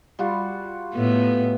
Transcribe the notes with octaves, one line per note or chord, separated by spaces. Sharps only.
G3 F4 F#4
A2 A3 B3